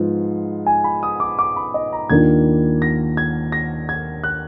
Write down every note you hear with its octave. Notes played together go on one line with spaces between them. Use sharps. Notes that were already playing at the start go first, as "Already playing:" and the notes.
Already playing: G#2 F3 B3 F4
G#5
B5
D#6
D6
D6
B5
D#5
A#5
D#2 D#3 A#3 D4 F4 G#6
A#6
G#6
A#6
G#6
F#6